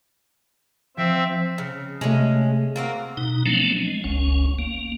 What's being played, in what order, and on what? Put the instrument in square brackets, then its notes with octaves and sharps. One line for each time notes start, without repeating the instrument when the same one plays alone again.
[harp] F3 D7 [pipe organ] C4 E5
[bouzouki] C#3
[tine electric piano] C3 A3 [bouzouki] G#3 C#4
[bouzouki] A#3 C4 F#4
[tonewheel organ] B2 D#4
F3 F#3 A3 B3 C4 D4
G#3
F#1 C#2 C#4
A#3